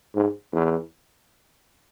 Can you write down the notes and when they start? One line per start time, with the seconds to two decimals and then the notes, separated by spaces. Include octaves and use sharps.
0.15 G#2
0.52 E2